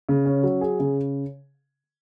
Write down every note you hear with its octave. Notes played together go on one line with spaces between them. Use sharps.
C#3
C#4
F#3
G#4
C#3